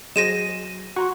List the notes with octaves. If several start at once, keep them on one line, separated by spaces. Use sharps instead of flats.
F#3 G#4 C5 D#5 A#6 D#7 E7
F#4 F#5 A#5 C6 C#6